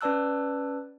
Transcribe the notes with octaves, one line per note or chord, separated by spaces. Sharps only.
C#4 B4 D5 A5 E6 F#6